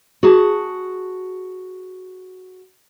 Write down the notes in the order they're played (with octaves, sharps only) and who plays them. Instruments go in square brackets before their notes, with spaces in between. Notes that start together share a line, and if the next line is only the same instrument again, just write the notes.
[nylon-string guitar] F#4 G#4 A5